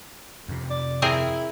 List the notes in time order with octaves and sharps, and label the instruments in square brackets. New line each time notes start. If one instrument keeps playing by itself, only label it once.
[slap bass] F2 C3
[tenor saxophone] D5
[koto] C4 G#4 A#4 [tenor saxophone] E4